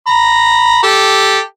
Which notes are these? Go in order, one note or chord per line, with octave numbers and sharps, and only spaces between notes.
A#5 B5
G4 A4